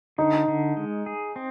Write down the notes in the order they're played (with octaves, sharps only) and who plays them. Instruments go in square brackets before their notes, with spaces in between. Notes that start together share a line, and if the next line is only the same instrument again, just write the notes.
[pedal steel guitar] D3 [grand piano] D#4
[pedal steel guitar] D3
G#3
G#4
C4